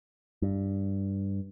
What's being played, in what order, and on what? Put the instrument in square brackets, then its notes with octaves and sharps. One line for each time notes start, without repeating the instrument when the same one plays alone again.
[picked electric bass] G2